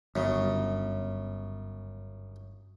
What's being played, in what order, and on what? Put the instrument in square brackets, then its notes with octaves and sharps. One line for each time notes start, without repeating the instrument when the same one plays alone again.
[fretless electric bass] G1 [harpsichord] F#2 C#3